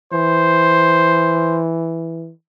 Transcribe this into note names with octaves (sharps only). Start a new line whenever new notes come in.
E3 C5